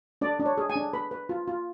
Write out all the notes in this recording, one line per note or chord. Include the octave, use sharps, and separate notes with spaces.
D4 D5
D4
C#5
G#4
G#5
D4
B4 B5
B4
F4
F4